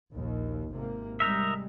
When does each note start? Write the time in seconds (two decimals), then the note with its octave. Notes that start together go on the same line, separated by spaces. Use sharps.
0.13 A#1 D#2
0.71 G#1 C3 A#3
1.20 C3 G3 G#3 D#4 A#4 E5